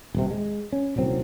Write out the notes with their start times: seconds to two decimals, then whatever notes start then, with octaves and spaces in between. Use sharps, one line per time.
0.14 D#1 C3
0.31 G#3
0.72 C#4
0.96 D#1 C2 F#3 C4